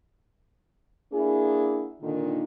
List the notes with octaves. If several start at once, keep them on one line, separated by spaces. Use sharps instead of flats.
A#3 D4 E4 F#4 G#4
A#2 D3 D#3